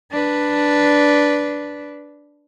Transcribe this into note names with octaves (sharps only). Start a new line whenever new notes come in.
D4 B4